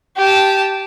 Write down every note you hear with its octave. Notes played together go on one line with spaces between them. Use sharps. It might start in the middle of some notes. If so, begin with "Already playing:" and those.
G4 A5